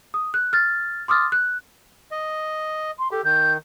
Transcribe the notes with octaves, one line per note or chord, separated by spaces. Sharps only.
D#6
F#6
F6 A6
C6 D6 D#6 F6 A6
F#6
D#5
C6
G4 A4
D#3 G6